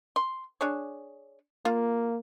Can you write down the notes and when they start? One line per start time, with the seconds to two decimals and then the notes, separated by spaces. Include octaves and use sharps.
0.16 C6
0.61 D4 G#4 C#5
1.65 A#3 F4